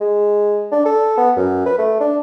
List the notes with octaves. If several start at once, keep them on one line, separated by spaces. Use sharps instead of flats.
G#3
D4
A4
B3
F#2
B4
A3
D4